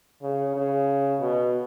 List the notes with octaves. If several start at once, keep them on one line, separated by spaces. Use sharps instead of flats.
C#3
C#3
B2